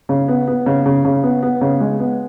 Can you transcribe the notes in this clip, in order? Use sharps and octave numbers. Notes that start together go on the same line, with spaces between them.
C#3
B3
B3
C#3
C#3
C#3
B3
B3
C#3
G#3
B3